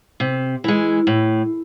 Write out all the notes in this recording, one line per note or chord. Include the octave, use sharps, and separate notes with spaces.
C3
E3 G#3
A2